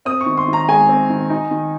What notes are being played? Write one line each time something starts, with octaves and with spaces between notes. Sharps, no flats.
C4 D#6
C#6
D#3
C6
D#3
A#5
G#3 G#5
C4
D#3
D#4
D#3